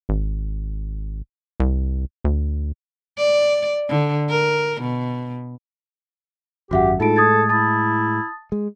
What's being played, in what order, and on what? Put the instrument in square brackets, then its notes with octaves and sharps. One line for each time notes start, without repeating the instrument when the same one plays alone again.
[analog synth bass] G#1
C2
D2
[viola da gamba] D5
D3
A#4
B2
[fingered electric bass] G#1 F#2 [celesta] F#4 E5 F#5 [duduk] G4
[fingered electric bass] A2 G#3 [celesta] D#4 F4 D7 [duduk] A4
[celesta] D#6 G#6 A6
[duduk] E4 [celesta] A5 D#6 A6
[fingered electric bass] G#3